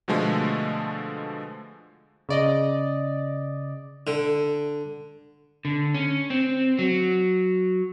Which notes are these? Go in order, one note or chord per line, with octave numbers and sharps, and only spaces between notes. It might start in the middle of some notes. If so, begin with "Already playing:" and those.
B2 D3 F3 G#3 A3
C#3 D5 D#5
D3
D3
C#4
C4
F#3